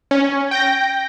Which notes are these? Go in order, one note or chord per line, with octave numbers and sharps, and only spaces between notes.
C#4
G5 G6 A#6